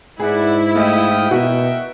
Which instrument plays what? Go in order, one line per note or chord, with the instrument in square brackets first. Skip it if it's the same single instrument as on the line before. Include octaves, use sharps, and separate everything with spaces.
[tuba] G#2 [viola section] E4 [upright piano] G#4 [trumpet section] B4 D5 F#5
[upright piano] A3 D#5 [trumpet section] F5 G5 D#6
[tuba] B2 [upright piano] F#4 [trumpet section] A#4 E5 G5